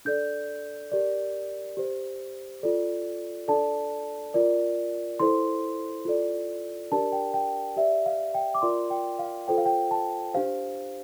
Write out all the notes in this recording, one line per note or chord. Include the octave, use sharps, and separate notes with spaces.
D4 A4 D5 G6
G4 A#4 D5
G4 C5
F4 A4 D5
D4 A4 D5 A5
F4 A#4 D5
E4 A4 C5 C6
F4 A4 D5
D4 G4 A#4 D5 A5
G5
G5
G4 D5 E5
F5
G5
D6
F4 A#4 D5 C6
G5
F5
F4 A4 C5 G5
F5
G5
A5
D4 G4 C5 F5